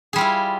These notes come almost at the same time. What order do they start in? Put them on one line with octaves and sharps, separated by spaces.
G#4 G3 F4 E4